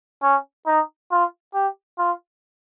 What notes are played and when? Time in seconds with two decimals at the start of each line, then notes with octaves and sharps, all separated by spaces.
0.23 C#4
0.67 D#4
1.11 F4
1.54 G4
1.99 F4